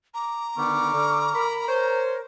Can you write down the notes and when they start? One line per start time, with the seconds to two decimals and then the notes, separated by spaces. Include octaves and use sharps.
0.14 A#5 D6
0.57 D3 D#3 B3 C#6 D6 F6
0.93 D3
1.34 A#4 B5
1.68 A#4 C5 C#5